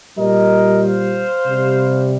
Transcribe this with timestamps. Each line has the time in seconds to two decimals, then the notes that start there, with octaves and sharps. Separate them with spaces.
0.17 A#2 G3 A#4 D#5
0.81 C5 F5
1.45 C3 G3